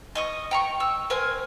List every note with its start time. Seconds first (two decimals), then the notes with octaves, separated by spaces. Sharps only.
0.15 D#5 C#6 D#6
0.51 G5 A#5 C#6
0.80 E6
1.10 A#4 C5 G#5